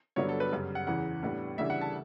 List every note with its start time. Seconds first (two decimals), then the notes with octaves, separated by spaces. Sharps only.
0.16 G2 D3 F#3 B3 D4 C#5
0.29 A4
0.40 B4
0.52 F#2 C#3 G3
0.75 F#5
0.87 E2 C#3 E3 F#5
1.23 A2 G3 B3 D4
1.58 D2 C#3 E3 G3 D4 E5
1.70 F#5
1.81 A5